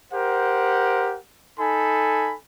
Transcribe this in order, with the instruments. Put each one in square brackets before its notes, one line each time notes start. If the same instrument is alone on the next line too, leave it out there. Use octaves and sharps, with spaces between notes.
[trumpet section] G4 A#4 C5 F#5
D#4 A4 G#5 B5